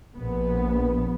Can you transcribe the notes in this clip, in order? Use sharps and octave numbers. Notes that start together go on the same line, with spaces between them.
A#1 B3